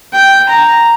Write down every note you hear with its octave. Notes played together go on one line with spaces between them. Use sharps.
G5
A#5